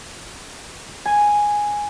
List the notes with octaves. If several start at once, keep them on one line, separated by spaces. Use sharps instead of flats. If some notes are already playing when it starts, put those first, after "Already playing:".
G#5